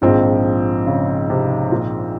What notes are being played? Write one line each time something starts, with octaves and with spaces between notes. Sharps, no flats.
A#1 G#2 D#3 F3 C4
C#3
C3
A#2